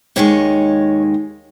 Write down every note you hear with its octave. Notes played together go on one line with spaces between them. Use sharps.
D#2 D#3 G#3 C#5